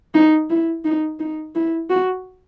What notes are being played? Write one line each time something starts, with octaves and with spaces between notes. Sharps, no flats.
D#4
E4
D#4
D#4
E4
F#4